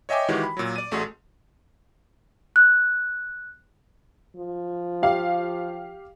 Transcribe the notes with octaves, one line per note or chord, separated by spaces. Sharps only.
C#5 D#5 E5 G5 G#5 D6
D#3 E3 G#3 E4 F#4 G4
B5
A#2 F#3
D5 D#7
A1 A3 F#4 G#4 C6
F#6
F3
G4 F5